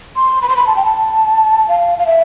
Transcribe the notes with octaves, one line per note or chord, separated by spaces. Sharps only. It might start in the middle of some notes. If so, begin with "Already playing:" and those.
C6
B5
C6
B5
A5
G5
A5
F5
F5
E5